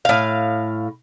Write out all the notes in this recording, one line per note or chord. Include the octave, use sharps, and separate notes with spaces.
A2 F5